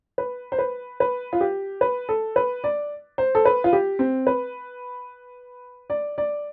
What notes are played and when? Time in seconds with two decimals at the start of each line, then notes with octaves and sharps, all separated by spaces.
0.18 B4
0.52 C5
0.59 B4
1.00 B4
1.33 F4
1.41 G4
1.81 B4
2.09 A4
2.36 B4
2.64 D5
3.18 C5
3.35 A4
3.45 B4
3.64 F4
3.73 G4
3.99 C4
4.27 B4
5.90 D5
6.18 D5